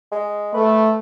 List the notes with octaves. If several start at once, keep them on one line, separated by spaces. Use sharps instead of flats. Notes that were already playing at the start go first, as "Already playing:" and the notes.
G#3
A3 B4